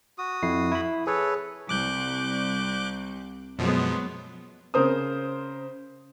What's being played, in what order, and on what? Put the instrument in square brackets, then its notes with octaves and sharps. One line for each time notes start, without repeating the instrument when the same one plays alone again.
[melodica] F#4 D#6
[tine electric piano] F2 E4 C7
E4 B5
[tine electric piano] G#4 [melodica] A4 B4 C#5
[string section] C2 [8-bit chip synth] D6 F#6 G6
[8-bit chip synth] F#2 B2 F3 [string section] F#3 G#3 B3
[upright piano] C#3 A#4 C5 D#6